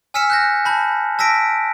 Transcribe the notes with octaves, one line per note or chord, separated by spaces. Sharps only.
G#5 E6 F6 B6 C#7 E7
F#6 G6 A#6
A5 B5 G6
A5 E6 A#6 B6 D7